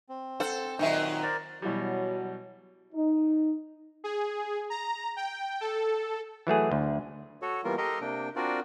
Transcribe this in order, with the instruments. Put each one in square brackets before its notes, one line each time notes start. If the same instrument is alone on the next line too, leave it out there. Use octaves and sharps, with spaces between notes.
[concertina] C4
[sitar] A4 [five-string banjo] C5 F#5
[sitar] A#2 D#3 F#3 [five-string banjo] D#4 E5
[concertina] A#4 C5 D5
[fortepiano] B2 E3 G3 [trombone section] F#3
[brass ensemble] D#4
[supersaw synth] G#4
A#5
G5
A4
[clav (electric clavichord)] E3 F#3 A3 G#4
D2
[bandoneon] F#4 A4 C#5
E3 G3 A#3 B3 F4 A#4
G4 A4 A#4 D#5 A#5 C6
C3 A#3 D4 G5
C4 D4 F4 F#4 A#4 D5